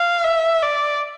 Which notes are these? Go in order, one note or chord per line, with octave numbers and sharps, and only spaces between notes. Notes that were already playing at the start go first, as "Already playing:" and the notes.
Already playing: F5
E5
D5